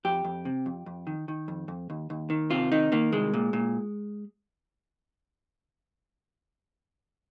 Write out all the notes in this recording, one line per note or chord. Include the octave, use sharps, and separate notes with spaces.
F2 G4
F2
C3
F2
F2
D#3
D#3
F2
F2
D#2
D#2
D#3
C3 F4
D#3 D#4
D#3 A#3
C2 G#3
A#2
A#2